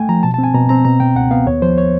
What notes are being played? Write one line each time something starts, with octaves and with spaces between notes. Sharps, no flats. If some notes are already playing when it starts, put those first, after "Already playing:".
Already playing: A3 G5 G#5
F3 A#5
B2 A5
A5
C4
G#5
B2 A#5
C4 A#5
B2 A#5
B2 G5
C#2 F#5
B3 F5
D#2 C#5
F3 C5
C#5